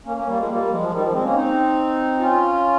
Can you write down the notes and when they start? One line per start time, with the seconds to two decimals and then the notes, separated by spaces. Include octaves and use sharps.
0.05 A#3 C#4
0.16 A#3 C#4
0.27 G3 A#3
0.38 F3 G#3
0.48 G3 A#3
0.62 A#3
0.70 F3 G#3
0.80 F3
0.91 D#3 G3
1.01 F3 G#3
1.12 G#3 C4
1.23 A#3 C#4
1.35 C4 D#4
2.19 C#4 F4